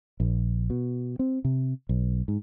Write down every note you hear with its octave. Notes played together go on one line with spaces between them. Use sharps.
A#1
B2
C4
C3
B1
G#2